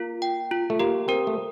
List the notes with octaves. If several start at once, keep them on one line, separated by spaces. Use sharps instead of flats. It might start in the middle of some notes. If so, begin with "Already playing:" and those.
Already playing: A#3 F4
G5
F4
A3
A#3 G4
C4 A#4
A3